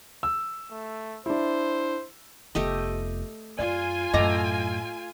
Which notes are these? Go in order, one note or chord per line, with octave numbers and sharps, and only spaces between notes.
E6
A3
D4 E4 C5
F1 A3 B3 G4 D#5
F#2 F4 D5 G#5
F#2 A2 A3 D#5 F#5 A#5 D6